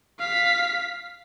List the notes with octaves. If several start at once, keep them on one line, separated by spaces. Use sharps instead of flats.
F5 B6